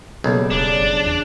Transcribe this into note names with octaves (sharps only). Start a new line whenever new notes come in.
B1 C#3 G3 A#3
D#1 D4
F#1
E2